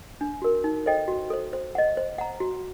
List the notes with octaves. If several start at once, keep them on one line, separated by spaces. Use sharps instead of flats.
D4
F#4 A#4
D#4
A4 C5 D#5 G5
F#4
A4 C5
C5
D#5 F#5
C5
F#5 A#5
F#4